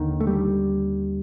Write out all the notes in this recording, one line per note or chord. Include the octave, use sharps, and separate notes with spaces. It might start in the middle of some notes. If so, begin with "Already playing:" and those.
Already playing: D#2 D3 D#3
A3
G3